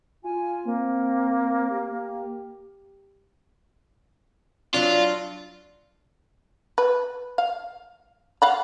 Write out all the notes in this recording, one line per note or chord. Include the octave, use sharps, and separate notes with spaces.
F4 G#5
A#3 C4
G4
F#3 D4 F4
B4
F5
F5 F#5 B5